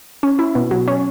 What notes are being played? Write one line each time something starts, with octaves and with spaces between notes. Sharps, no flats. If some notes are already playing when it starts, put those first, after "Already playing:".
C#4
E4
B2
F#3
C#4